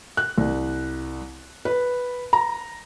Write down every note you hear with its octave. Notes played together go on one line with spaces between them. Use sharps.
F#6
C2
B4
A#5